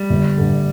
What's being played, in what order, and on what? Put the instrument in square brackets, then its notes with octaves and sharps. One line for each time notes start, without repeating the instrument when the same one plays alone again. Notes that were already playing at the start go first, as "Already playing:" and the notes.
Already playing: [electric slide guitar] G3
[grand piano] G1
G2 D3